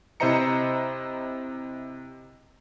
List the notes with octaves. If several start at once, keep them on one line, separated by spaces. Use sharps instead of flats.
C3 E4 C5 D#5 A#5 C#7